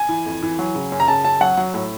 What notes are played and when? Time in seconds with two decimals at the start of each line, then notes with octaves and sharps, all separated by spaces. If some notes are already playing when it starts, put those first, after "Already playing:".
Already playing: G#5
0.09 E3
0.26 F2
0.43 E3
0.59 F#3
0.75 C#3
0.92 F#2
1.00 A#5
1.08 C#3 A5
1.25 F#2 A5
1.41 F#3 F#5
1.57 F#3
1.74 A2